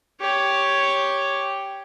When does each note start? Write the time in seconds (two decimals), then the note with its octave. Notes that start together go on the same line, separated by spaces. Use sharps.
0.21 G4 C#5